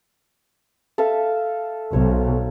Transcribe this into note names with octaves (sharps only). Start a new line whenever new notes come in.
A4 E5 F5
B1 C5 C#5